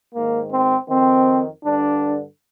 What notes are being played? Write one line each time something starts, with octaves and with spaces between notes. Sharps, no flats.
G#2 D#3 A#3
C4
F2 D#3 C4
G2 D3 D4